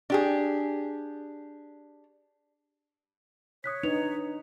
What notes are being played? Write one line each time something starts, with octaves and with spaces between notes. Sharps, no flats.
D4 G4 G#4
C#5 D#6 F#6 B6
D4 D#4 B4 F7